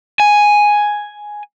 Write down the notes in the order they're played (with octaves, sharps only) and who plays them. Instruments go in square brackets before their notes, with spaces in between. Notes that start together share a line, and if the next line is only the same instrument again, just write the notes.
[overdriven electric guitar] G#5